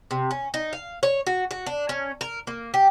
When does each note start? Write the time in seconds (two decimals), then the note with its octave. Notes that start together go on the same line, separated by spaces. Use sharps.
0.11 C3
0.31 C#4
0.54 D#4
0.73 F5
1.03 C#5
1.27 F#4
1.51 F#4
1.66 D4
1.89 C#4
2.21 A#4
2.47 A#3
2.74 G4